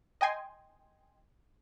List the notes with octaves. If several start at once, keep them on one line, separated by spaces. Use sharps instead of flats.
D#5 G5 G#5 C6